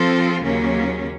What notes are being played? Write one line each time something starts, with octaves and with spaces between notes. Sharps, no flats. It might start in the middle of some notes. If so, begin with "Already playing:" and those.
Already playing: F3 C4 F4 A4
D#2 C#3 F#3 A#3 C#4